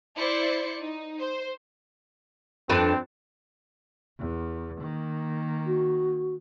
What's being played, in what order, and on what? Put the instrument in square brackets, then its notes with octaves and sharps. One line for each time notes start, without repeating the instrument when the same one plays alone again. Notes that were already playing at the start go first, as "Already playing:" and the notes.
[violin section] E4 C5 D5 C#7
D#4
C5
[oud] F2 D4 B4 [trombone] C4
[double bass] E2
D#3 A#3
[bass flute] F#4